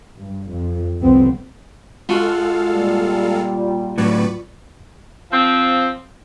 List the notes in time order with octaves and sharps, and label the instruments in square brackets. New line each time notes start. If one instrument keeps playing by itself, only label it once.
[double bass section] G2
F2
F1 C2 F2 C#3 B3 C4
[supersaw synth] G#3 A4 F5 [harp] F4 F#4
[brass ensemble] A#2 G3
[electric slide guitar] A2 F#3 [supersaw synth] B4 D5 C#6
[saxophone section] F3 C4